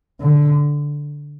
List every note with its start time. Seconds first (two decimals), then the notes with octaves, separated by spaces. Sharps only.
0.21 D3